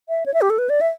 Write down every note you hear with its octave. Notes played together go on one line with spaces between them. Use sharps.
E5
C#5
E5
G4
A4
B4
D5
E5